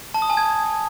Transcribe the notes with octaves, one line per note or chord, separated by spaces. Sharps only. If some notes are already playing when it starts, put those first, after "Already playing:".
A5
D#6
G#5
G#6